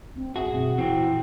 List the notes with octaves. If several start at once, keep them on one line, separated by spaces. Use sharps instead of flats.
C4 D4
G2 F#4 G#4 E5
F#2 B2 C4
A#2 E3 C4 G5